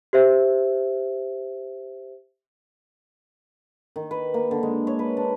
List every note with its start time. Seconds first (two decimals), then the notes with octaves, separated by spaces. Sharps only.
0.13 G4 C5 E5
3.96 D#3
4.11 B4
4.34 A#3
4.51 D3
4.63 G#3
4.87 C#5
4.99 B4
5.17 D4